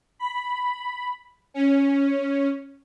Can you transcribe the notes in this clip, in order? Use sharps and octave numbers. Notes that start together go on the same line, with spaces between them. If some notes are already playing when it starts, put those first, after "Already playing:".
B5
C#4